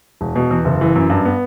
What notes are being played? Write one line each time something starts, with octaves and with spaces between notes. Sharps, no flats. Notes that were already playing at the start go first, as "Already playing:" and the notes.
E1
B2
E2
F#1
E3
F#2
G2
B3